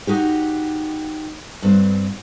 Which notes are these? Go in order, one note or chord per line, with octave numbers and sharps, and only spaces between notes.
D#4 F#4 G4
G2 C4